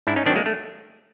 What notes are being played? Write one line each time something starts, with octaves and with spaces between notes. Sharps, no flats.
G#2 D4 E4
C#4 D#4
D#3 F#3 C4 D4
G#3 A#3
A3